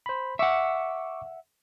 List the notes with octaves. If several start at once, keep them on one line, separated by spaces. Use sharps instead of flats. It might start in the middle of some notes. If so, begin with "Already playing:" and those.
C5 B5
E5 F#5 C#6 D6 E6